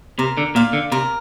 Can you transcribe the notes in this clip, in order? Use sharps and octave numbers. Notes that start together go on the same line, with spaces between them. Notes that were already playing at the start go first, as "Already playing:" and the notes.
C3 A#4
D3
A#2 D5 F5
D3
C3 A#4